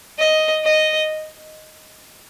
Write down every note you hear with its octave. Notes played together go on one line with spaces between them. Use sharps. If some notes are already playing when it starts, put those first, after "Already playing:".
D#5
D#5